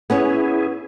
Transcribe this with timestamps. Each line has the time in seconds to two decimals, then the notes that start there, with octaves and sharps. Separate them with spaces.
0.10 B3 C#4 E4 G#4 C#5